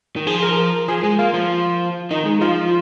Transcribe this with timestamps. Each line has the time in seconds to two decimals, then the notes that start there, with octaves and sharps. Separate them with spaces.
0.16 D#3
0.27 F3 G#4
0.43 A#4
0.57 A#4
0.88 F3 G#4
1.03 G#3
1.19 A#3 F4
1.34 F3
2.11 D#3 D#4
2.25 G#3
2.41 F3 F4